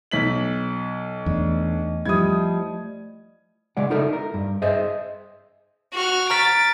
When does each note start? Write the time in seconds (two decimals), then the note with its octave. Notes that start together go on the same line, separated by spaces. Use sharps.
0.11 B1 B6 F#7
1.26 E2 A3 D4 D5 D#5
2.05 F3 G3 E4 D#6 G#6
3.77 C#3 G#3 D5 F#5
3.90 D#4 E4 A4 A#4 E5
4.13 A#4
4.34 G2
4.62 G#4 C5 D#5 E5
5.94 F#4 F6
6.30 A#5 F6 A6 B6 D7